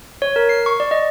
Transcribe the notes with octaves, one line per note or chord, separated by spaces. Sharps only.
C#5
A#4
C7
C#6
D5
D#5